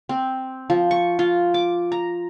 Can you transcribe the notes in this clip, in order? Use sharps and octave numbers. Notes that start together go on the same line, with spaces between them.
C4
F3
C#6
F4
D6
A#5